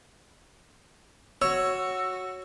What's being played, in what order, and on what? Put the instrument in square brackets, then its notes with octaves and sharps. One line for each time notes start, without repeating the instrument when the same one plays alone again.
[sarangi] F#4 [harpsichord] C#5 [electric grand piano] E6